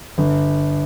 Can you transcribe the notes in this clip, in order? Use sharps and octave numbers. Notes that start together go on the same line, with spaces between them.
G1